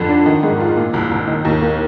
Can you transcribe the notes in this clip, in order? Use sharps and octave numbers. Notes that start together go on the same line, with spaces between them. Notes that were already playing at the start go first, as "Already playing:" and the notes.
Already playing: F2 D3
D4
D#3
G#2
F4
A#2
C2
C2
D#3
D#2
A#3